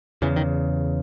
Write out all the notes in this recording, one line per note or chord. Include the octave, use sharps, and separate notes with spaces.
E2 C#3 E3
D#3